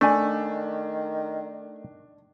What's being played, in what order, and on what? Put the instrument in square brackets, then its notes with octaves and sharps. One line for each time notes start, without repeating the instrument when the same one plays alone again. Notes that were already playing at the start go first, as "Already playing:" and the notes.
[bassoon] D#3 [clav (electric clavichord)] A3 [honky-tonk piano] D4 [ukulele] C5 G#5 B5